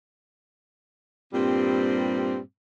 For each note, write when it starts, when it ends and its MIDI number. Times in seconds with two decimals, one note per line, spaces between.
1.33 2.38 43
1.33 2.38 46
1.33 2.38 55
1.33 2.38 60